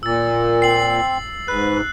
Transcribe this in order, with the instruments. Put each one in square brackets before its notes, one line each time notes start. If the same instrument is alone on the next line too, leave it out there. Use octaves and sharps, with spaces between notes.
[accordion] A#2 [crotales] E6 A6
[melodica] C4 [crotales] C7 F#7
[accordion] G#2 [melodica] B4 [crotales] F#6